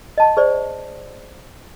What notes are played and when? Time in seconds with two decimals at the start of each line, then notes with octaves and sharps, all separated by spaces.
0.18 D#5 A5
0.37 G#4 C5 D5